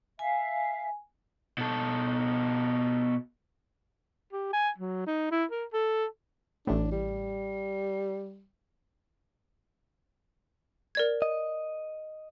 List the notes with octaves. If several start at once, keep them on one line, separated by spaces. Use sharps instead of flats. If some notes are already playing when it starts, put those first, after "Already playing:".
E5 F5 G#5
B2 A4
G4
G#5
F#3
D#4
E4
A#4
A4
A1 A2 D4
G3
A#4 D5 G#6
D#5